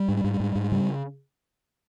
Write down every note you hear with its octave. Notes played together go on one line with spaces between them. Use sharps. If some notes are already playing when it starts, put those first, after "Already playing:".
Already playing: G3
G#2
G#2
G#2
G#2
C#3 G3